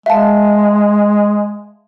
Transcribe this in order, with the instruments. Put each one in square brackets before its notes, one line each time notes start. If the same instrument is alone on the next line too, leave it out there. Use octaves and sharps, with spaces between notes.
[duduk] G#3 [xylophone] E5 F5 A5